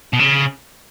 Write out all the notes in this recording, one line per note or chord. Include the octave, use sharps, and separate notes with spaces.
B2
C#3